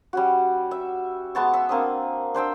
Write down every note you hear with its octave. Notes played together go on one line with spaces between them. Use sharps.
G3 C#4 F#4
E5
G#3 B3 A5 C#6
E5
A#3 C4 D4 D#6
D4 C5 G5 E6